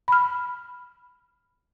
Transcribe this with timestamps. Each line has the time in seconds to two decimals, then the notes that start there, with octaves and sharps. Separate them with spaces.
0.08 B5 F6